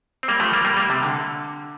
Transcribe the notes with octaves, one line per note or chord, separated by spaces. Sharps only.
C4
G3 A#3
F3 A3
G3 A#3
G3 A#3
G3 A#3
C3
D3